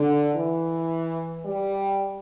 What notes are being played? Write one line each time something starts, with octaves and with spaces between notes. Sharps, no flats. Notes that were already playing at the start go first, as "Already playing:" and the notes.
Already playing: D3
E3
G3